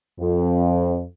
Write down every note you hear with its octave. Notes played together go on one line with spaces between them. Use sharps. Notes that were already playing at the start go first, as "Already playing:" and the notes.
F2